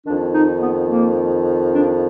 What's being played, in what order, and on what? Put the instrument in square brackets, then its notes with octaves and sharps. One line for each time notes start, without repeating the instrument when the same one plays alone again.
[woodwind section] F2 D#3 D4
D#4
B3
A#3
D4